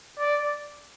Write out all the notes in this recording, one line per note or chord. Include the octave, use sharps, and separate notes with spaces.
D5